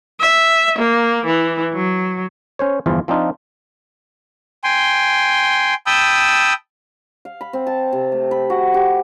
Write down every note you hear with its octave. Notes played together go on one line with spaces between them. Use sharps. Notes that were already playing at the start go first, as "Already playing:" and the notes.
E5
A#3
E3
F#3
C#4 C5 C#5
G1 E2 E3 F3 F4
F3 C4 D4 D#4 F4
G5 G#5 C6
G5 A5 B5 D#6 E6 G6
F5
B5
C4
A5
C3
A3
B5
F#4
G4